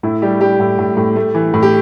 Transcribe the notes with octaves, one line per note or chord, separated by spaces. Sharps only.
A2 E4
G3 G4
G3 G4
A2
A2
A2
A3
E3
A2
G4